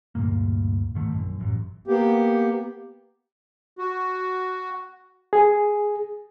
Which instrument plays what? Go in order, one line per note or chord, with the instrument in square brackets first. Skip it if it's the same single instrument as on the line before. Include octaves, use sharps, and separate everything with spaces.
[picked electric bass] D2 G2 A#2 A#3
G#2 D#3 A3
A#1 F#2
A1 F#2
[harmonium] A#3 B3 G4
[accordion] F#4
[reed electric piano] G#4